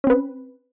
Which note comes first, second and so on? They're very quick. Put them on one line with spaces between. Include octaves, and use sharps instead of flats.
C#4 C4 B4